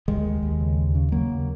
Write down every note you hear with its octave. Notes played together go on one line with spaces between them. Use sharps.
D#2 D#3 G#3
D#2
D#2
C#3
D#2
C#3
C#3 F#3 A#3
D#2